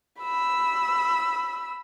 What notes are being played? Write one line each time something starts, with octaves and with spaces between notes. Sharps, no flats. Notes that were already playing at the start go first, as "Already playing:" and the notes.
B5 E6